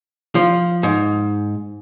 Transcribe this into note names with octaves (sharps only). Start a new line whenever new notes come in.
F3
G#2